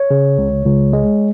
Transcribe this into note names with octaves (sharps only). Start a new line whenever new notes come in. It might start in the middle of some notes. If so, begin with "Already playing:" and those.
Already playing: C#5
C#3
C#2
C#2
G#3